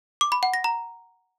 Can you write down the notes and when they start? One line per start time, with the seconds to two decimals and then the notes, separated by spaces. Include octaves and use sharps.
0.21 D6
0.32 B5
0.43 F#5
0.54 A#6
0.64 A#5